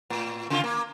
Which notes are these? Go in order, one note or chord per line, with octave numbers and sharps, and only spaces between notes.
A2
C#3 F4
A#3